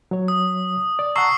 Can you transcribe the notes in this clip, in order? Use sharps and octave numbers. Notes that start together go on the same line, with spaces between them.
F#3 C#5
D#6
D5
F#5 A5 A#5 C#6 E6 C7